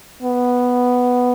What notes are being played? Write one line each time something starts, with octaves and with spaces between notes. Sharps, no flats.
B3